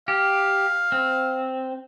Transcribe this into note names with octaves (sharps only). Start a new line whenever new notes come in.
G4 F5
C4